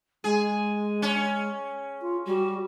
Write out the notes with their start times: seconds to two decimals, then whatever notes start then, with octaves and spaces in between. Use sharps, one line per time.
0.24 G#3 G#4
1.02 C#4
2.01 F4
2.26 G3 F#4